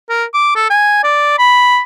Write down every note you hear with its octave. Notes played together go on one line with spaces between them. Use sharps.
A#4
D6
A4
G#5
D5
B5